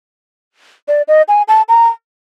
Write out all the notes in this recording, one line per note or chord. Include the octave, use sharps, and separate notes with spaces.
D5
D#5
G#5
A5
A#5